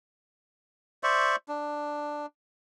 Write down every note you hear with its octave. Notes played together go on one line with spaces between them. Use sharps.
C5 D5 E5 C#6
D4